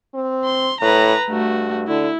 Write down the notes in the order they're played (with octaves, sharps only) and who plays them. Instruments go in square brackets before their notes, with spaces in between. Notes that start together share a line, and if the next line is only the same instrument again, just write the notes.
[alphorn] C4
[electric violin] C6
[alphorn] A2 [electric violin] B4 A#5
[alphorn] G2 [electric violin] A3 F#4
[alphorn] D3 [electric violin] E4